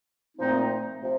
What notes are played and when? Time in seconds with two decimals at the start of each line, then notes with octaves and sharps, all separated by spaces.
0.37 A#2 F3 A3 C4 D#4
1.02 C3 F3